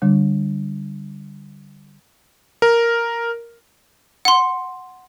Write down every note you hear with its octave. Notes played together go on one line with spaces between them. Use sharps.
D3 G3 D4
A#4
F#5 C6